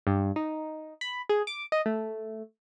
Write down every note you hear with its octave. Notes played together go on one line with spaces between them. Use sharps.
G2
D#4
B5
G#4
D6
D#5
A3